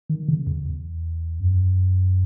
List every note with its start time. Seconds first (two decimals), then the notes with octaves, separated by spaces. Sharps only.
0.09 D#3
0.28 C#3
0.47 E2
0.65 E2
1.40 F#2